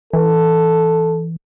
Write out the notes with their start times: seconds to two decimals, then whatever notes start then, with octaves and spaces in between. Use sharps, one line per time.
0.13 E3 A4